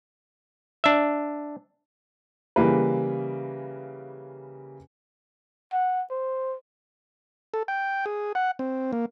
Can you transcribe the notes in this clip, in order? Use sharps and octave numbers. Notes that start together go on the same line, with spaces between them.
D4 E5
C#3 E3 G3 A#3 B4
F#5
C5
A4
G5
G#4
F#5
C4
A#3